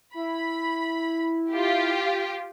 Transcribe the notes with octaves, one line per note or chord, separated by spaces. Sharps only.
E4 B5
F4 G4